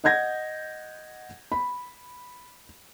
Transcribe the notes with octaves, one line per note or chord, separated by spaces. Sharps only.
D#5 F#5 G6 G#6 A#6
B5